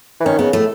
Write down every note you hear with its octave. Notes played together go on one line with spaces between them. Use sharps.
E3
D#3 C#4
C#3 B3
A2 A3